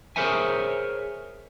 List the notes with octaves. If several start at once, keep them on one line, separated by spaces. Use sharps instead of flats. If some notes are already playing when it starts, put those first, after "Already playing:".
G#4 A#4 C5 C#5 E5 G#5